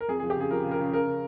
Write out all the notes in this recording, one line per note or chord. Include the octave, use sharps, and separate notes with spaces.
A#4
F2 G#4
F3 G#4
G4
C#3 G#4
F3 A#4
C#3
A#4
C#3
C#3 A#4
C#3